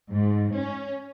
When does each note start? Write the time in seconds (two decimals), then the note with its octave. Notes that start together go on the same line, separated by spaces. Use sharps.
0.10 G#2
0.53 C#4